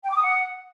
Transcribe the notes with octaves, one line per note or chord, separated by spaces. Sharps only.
G5
D6
D#6
F#5